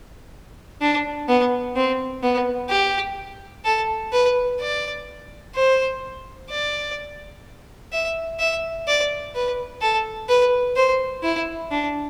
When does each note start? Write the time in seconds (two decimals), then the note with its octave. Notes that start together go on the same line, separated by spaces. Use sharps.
0.81 D4
1.28 B3
1.76 C4
2.23 B3
2.70 G4
3.65 A4
4.13 B4
4.61 D5
5.55 C5
6.50 D5
7.93 E5
8.39 E5
8.88 D5
9.35 B4
9.82 A4
10.29 B4
10.76 C5
11.24 E4
11.71 D4